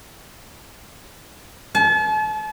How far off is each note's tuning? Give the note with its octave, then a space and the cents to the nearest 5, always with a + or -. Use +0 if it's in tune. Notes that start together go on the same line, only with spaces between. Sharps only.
A5 -40